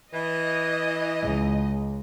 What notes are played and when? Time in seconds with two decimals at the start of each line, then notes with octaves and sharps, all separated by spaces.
0.13 E3 D#5
1.22 C#2